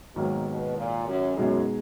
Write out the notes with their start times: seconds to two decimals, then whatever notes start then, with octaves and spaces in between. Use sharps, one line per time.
0.16 G#2 B2 D#3 F#3 A#3
0.47 B2
0.76 A#2
1.07 F#2
1.37 F#2 B2 G#3 D#4 G#4